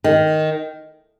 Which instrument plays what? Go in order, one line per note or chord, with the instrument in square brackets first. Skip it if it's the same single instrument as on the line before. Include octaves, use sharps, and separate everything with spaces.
[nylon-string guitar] D#3